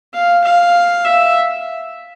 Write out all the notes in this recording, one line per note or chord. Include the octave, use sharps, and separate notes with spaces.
F5
F5
E5